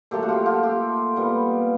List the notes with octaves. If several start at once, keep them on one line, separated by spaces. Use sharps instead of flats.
A#2 F#3 A3 G4 A4
F#4
F4 G4
F4 G4
F4 G4
A#2 G3 B3